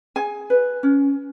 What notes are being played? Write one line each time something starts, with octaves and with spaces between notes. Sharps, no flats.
G#4 G#5
B4
C#4